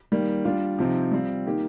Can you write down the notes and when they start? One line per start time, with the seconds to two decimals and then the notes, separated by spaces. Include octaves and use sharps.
0.12 D#3 G3 A#3
0.45 G3 D4 F4
0.78 C3 F3 C4 D#4
1.12 G3 C4 F4
1.46 D#3 A#3 D#4 G4